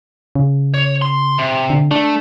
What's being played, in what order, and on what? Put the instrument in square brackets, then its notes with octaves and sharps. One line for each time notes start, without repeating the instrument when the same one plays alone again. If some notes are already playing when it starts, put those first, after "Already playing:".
[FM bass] C#3
[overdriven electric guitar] C#5
C6
C3
[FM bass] D3
[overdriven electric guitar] A3 [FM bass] D4